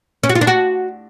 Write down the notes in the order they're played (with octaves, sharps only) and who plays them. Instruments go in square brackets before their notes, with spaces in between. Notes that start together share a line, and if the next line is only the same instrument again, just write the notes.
[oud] C#4
F#4
F4
D4
F#4